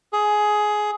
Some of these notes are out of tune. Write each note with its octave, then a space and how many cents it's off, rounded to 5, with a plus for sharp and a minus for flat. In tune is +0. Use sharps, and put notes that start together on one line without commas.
G#4 +15